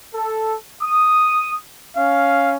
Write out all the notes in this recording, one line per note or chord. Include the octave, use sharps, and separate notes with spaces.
A4
D#6
C#4 F5